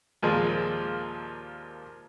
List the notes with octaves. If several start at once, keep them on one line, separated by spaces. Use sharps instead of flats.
D#2 A#2 F3 G#3